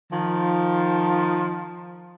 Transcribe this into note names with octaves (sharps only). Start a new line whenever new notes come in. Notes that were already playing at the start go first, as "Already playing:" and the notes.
D#3 F3